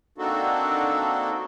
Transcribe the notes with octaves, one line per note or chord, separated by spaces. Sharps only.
A#3 C4 D4 D#4 F#4 A4